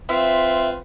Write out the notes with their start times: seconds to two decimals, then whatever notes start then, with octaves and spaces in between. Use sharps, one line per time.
0.09 C4 F4 B4 E5